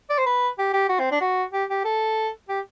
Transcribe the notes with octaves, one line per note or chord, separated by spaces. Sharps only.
D5
C5
B4
G4
G4
F#4
C4
D4
F#4
G4
G4
A4
G4